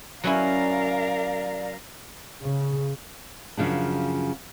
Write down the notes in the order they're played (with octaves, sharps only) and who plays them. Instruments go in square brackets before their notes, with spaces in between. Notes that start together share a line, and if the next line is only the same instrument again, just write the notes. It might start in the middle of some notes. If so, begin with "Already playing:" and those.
[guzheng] F#3 C#4 E4 [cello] A#4 F5 [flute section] D5 A#5
[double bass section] C#3
[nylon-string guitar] F#2 C#3 F3 D4